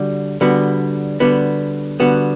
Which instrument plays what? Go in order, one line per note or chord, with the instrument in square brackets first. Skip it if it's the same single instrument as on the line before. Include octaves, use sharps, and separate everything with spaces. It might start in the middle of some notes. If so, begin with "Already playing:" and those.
Already playing: [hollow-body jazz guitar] D3 G3 F#4
D3 G3 B3 F#4
D3 G3 B3 F#4
D3 G3 B3 F#4